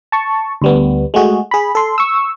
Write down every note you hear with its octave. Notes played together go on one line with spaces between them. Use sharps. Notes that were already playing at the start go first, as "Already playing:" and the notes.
A5 C#6
D2 G3 B3
G#3 A3 F#4 G#4
G#4 B5
A4 C6
C#6 E6